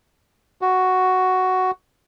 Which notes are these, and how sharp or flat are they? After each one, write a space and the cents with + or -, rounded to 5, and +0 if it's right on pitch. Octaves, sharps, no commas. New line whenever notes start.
F#4 +5